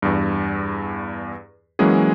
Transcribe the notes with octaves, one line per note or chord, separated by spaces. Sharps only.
E2 G2
E3 F#3 G#3 A#3 C#4 G#4